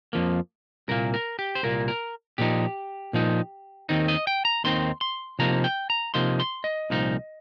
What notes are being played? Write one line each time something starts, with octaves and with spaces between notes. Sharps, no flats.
F2 F3 A#3
C2 A#2 A#3 A#4
A#4
G4
C5
C2 A#2 A#3 A#4
A#4
A#2 F3 D#4 G4
A#2 F3 D#4
D#2 D#3 C4 D#4
D#5
G5
A#5
D#2 D#3 C4 D#4 C6
C6
C3 F3 A#3 D#4 A#5
G5
A#5
C3 F3 A#3 D#4 C6
C6
D#5
C2 A#2 F3 D#4